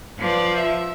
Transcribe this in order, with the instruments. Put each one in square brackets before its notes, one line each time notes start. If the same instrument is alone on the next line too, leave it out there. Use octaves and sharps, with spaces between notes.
[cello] F3 [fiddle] B4 D5
[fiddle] E5